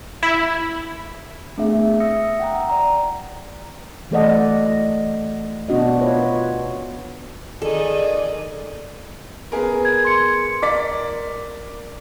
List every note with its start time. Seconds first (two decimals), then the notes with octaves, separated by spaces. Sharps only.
0.23 E4
1.58 A3 B3 C4 D4 G#4 E5
2.00 E5 D#6 E6 A#6 C#7
2.40 F#5 G5 A#5
2.69 D5 A#5
4.11 E3 A3 A4 D5 D#5 F#5
5.69 B2 B3 D4 F#4 D#5
6.00 F4 B4 C#5
7.62 D#3 G#4 A4 D5 D#5
9.52 B3 G#4 A#4
9.85 G#6
10.05 C6 C#7
10.62 A#4 D5 D6 B6